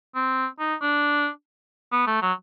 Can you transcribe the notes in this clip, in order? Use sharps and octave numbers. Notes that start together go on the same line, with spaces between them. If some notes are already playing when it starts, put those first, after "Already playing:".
C4
D#4
D4
B3
A3
F#3